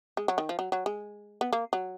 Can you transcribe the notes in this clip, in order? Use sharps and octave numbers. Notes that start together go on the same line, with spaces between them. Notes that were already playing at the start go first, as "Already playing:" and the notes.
G#3
F#3
D#3
F3
F#3
F#3
G#3
B3
A#3
F#3